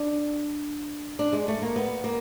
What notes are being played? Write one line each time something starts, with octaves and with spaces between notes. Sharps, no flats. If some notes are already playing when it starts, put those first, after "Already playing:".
Already playing: D4
D4
G#3
A3
A#3
B3
A#3